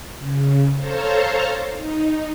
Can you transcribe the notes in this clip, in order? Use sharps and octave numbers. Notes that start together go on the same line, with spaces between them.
C#3
A4 C5 C#5 F5 A5 A#5
D#4